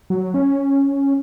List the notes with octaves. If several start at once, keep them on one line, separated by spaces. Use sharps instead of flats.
F#3
C#4